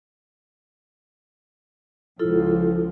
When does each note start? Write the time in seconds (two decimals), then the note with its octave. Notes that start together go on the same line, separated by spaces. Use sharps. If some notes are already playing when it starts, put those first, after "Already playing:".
2.19 C#2 F3 E4 F4 A4